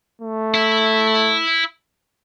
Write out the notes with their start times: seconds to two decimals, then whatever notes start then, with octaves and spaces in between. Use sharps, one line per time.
0.22 A3
0.54 E4